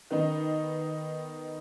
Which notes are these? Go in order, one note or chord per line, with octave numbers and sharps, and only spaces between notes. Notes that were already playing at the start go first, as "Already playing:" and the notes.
D#3 B3 D#4